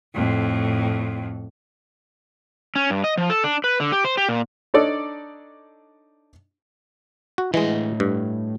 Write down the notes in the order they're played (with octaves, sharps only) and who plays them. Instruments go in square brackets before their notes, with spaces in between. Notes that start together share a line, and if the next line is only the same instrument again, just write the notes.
[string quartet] F2 A2
[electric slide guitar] C#4
G2
D#5
F3
A4
D4
B4
D3
G4
C5
G4
A#2
[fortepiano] D4 D#4 A4 C#5 D5
[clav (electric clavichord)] F#4
[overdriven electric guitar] A2 D#5 [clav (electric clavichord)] E3 G#3
[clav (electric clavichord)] G2